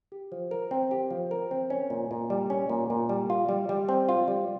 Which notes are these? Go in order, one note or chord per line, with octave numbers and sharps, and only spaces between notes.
G4
F3
A#4
C4
G4
F3
A#4
C4
C#4
A#2
A#2
G3
C#4
A#2
A#2
G3
F4
G3
G3
C4
F4
G3